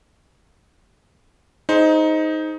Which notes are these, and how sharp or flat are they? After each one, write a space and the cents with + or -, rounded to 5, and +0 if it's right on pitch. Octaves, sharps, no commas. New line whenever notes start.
D#4 +10 G#4 +30 C5 +0